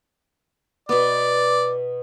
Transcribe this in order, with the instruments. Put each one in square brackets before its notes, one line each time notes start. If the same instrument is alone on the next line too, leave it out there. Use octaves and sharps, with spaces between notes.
[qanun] B2 B3 [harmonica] D5